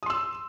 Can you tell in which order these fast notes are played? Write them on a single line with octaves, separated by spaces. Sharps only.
D#6 C6 E6